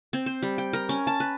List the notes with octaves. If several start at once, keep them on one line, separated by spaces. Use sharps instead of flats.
C4
C5
G3
G5
A#4
C#4
A5
B4